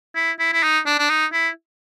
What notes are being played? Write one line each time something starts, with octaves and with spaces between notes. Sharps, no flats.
E4
E4
E4
D#4
D4
D4
D#4
E4